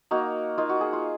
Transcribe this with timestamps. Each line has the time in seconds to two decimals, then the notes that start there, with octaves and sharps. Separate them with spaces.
0.11 A#3 D#4 F#4
0.58 A#3 D#4 F4
0.69 F#4
0.81 G#4
0.93 F4